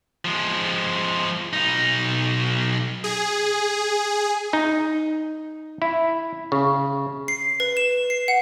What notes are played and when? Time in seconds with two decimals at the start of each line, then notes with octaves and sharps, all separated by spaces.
0.25 F3 G#3
1.53 B1 D#4
3.04 G#4
4.53 D#4
5.82 E4
6.52 C#3
7.28 C7
7.60 B4
7.77 E7
8.10 C7
8.28 F#5